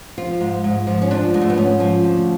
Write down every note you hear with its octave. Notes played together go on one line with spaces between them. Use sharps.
F3 F4
G#2
G#2
F3
C#4
F3 D4
G#2 G#3
A3
B3
G#2 C#4
F3
D2